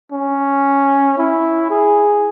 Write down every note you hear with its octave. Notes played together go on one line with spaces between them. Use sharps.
C#4
E4
G#4